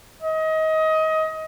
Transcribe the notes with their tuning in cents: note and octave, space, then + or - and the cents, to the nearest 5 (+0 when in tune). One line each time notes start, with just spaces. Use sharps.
D#5 +25